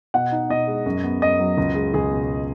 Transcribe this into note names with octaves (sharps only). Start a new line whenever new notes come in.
B2 F#5
D#4
B2 D#5
G#3
F#2
B3
F#2 D#5
F#3
C#2
G#3
C#2 G#4
B2